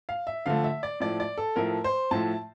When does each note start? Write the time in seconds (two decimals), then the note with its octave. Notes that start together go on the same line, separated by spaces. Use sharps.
0.09 F5
0.27 E5
0.46 D3 F3 A3 F5
0.64 E5
0.83 D5
1.00 A2 F3 A3 D5
1.20 D5
1.37 A4
1.56 A2 F3 A3 A#4
1.84 C5
2.11 A2 F3 A3 A5